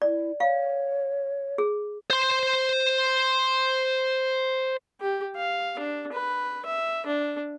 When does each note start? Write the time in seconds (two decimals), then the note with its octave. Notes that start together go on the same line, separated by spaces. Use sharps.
0.02 E4 D5
0.40 C#5 F5
1.58 G#4
2.10 C5 C6
5.01 G4
5.36 F5
5.79 D4
6.12 B4
6.66 E5
7.07 D4